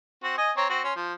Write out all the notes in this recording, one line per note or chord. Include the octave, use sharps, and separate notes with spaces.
C4 F#4
D#5 G#5
C4 C#5 A#5
C4 F#4
C#4 C6
F3